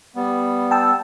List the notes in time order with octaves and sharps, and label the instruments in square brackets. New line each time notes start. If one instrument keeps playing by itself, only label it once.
[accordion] G3 B3
[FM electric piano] G5 A5 E6